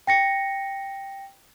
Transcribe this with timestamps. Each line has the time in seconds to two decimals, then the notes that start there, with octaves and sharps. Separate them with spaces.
0.07 G5 A#6 C#7